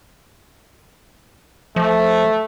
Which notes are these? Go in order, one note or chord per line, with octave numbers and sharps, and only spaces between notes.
F3 A3